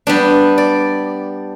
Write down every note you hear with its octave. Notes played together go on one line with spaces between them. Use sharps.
G3 B3 D4
D5